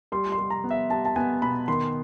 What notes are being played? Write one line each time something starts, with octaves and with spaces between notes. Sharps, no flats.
G3 C6
C6
G3
A#5
B3
E5
G3 A5
A5
B3 G#5
B2 B5
D#3 C6